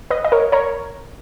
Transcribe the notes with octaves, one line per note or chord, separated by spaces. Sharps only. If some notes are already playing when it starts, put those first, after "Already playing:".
B4 D#5
D#5
A#4 C#5
A#4 C#5